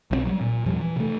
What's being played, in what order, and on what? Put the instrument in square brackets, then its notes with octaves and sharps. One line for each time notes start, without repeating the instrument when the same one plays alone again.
[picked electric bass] B1 E3 C4
F#3 G3
A#2
E2 A2 F3 G3
E3
C3 A3